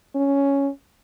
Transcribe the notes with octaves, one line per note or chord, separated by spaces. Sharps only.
C#4